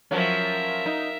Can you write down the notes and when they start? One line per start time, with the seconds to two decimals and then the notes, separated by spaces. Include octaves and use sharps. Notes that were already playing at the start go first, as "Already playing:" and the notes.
0.11 F3 F#3 C#4 A#4 E5
0.86 D#4